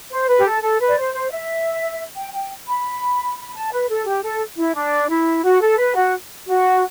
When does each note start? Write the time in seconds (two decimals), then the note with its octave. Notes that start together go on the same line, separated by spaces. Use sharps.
0.10 C5
0.28 B4
0.38 G4
0.44 A4
0.62 A4
0.79 B4
0.88 D5
0.96 C5
1.13 C5
1.30 E5
2.16 G5
2.33 G5
2.67 B5
3.37 B5
3.54 A5
3.72 B4
3.89 A4
4.05 G4
4.23 A4
4.57 E4
4.74 D4
5.09 E4
5.43 F#4
5.61 A4
5.78 B4
5.95 F#4
6.46 F#4